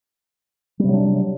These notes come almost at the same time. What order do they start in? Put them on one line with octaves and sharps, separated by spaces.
G3 C3 F#3 D4